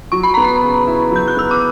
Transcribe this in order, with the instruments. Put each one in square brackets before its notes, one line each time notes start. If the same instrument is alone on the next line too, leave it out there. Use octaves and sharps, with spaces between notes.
[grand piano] F#3 [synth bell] C#6
[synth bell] B5
[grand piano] B3 [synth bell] A#5
[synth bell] B5
[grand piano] C#3
E4
[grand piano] F#3 [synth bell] G6
[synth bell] F#6
[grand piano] B3 [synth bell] E6
[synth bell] D6